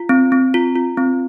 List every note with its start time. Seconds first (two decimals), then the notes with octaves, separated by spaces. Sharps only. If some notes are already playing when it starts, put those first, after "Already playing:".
Already playing: F4
0.09 C4
0.32 C4
0.54 F4
0.76 F4
0.97 C4